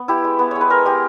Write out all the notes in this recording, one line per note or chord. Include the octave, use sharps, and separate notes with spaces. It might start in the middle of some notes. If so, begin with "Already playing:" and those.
Already playing: B3
E4 G4
G#3
B3
G#3 C#5
B4
G#3 A#4
G#3 G4